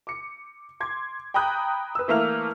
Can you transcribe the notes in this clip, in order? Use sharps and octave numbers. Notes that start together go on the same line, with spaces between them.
D6 C#7
C6 D6 G#6
G5 A#5 B5 D#6 F#6 G6
B4 E6
E3 A3 A#3 F6 F7